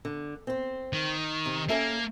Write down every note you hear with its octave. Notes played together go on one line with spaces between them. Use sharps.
D3
C4 C5
D#3
C3
A#3 C#4 A4 E5